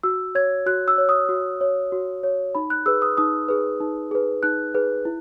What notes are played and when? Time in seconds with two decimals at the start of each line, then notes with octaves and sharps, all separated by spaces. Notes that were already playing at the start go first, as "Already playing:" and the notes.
0.03 F#4 E6
0.35 C#5 G#6
0.66 F#4 F#6
0.88 E6
0.98 C#5
1.09 D#6
1.29 F#4
1.61 C#5
1.92 F#4
2.23 C#5
2.55 D#4 B5
2.70 F#6
2.86 G#4 B4 E6
3.02 D#6
3.17 D#4 D#6
3.49 G#4 B4
3.80 D#4
4.11 G#4 B4
4.43 D#4 F#6
4.74 G#4 B4
5.05 E4